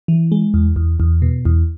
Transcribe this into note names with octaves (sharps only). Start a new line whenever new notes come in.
E3
G#3
E2
E2
E2
B2
E2